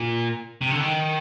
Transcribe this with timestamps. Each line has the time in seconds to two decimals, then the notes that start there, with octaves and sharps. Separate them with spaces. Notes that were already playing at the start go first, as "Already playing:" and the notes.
Already playing: A#2
0.61 C3
0.71 D3
0.80 D#3